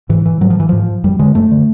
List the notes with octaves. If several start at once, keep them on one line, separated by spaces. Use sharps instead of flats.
G#2 E3
E3
G#2 F#3
F3
E3
G#2 F3
F#2 G3
D3 G#3
F#2 A3
D3